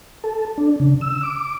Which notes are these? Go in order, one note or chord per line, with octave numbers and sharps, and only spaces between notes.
A4
D4
C#3
E6
D6